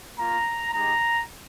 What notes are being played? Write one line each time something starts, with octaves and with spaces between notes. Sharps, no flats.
A#3 F4 A#5
G#3 D#4 G4 A#5